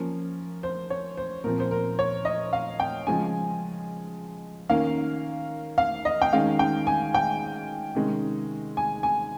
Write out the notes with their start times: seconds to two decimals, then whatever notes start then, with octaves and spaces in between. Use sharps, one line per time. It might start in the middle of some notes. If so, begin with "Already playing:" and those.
Already playing: F3 A#3 C#4
0.63 C5
0.90 C#5
1.17 C5
1.44 A#2 F3 C4 A#4
1.60 C5
1.71 A#4
1.99 C#5
2.25 D#5
2.53 F5
2.80 G5
3.06 C#3 F3 G#3 C#4 G#5
4.69 D#3 A#3 C#4 F5
5.78 F5
6.05 D#5
6.22 G5
6.33 D#3 G#3 C#4 F5
6.59 G5
6.87 G#5
7.14 G5
7.95 C3 D#3 G#3 C#4
8.77 G#5
9.03 G#5